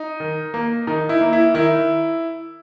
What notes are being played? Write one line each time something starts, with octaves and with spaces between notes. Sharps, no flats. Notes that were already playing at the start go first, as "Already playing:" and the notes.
Already playing: D#4
D#3
A#3
D#3 D#4
E4
A#3
E4
D#3 E4